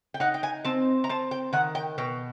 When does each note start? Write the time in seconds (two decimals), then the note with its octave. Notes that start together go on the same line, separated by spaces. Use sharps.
0.14 G5
0.20 D#4 F#5
0.34 G5
0.43 G#5
0.65 C4 A5
1.04 A#5
1.09 C4 A5
1.31 G5
1.53 D#3 F#5
1.75 G5
1.98 B2 G5